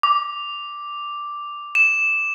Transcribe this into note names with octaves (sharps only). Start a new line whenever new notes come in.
D6
E7